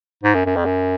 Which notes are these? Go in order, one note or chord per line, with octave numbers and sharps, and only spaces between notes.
G#2
F#2
F#2
F2
F#2